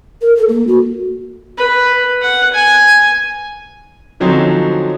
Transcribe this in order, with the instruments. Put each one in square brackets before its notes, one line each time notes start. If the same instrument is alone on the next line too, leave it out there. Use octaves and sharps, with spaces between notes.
[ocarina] A#4
A4
A#3
F#4
[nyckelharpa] B4
F#5
G#5
[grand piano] D3 F3 F#3 C4 C#4 D#4